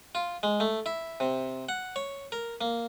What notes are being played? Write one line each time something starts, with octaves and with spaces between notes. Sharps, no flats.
F4
G#3
A3
E4
C3
F#5
C#5
A#4
A#3